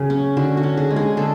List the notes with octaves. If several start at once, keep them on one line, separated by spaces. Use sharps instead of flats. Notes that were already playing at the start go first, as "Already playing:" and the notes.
Already playing: C#3 F#3 G#4
C#4
D3 F#4
F#4
C#4
G#4
G#3
G#4
D3 A4